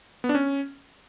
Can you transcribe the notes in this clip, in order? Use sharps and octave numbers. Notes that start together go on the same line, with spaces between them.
B3
D4
C#4